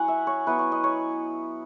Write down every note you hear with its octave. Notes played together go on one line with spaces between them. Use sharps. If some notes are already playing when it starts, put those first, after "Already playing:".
Already playing: F#3 C#4 E4 F#5 G#5
E5
C#5
F#3 B3 E4 B4
C#5
D#5
C#5